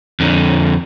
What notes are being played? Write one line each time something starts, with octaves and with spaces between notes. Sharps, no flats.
F2 D3